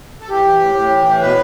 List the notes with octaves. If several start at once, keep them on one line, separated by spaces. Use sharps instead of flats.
A4
E3 G4
E3
A2
A2
E3
A2
B2 B4